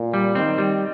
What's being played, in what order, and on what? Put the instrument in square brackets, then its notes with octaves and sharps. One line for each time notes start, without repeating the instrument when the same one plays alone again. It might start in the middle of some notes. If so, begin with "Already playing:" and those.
Already playing: [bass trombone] A#2
[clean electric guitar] G3
[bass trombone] D#3 [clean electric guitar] C4
[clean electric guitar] G3